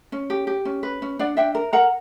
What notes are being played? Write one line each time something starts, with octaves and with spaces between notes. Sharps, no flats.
C#4
G4
G4
C#4
B4
C#4
D4 D5 F#5
D4 E5 G5
A#4
A#4 F#5 A#5